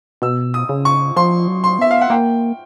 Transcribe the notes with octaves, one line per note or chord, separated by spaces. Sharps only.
B2 E6
D#6
C#3
C#6
F3 C6
F#3
C6
B3 E5
F5
F#5
A#3 G5